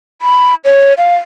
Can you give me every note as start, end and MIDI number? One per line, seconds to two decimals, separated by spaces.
0.22 0.55 83
0.65 0.93 73
0.98 1.14 77